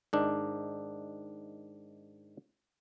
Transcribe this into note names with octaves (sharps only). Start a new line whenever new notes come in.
G#2 D#3 D4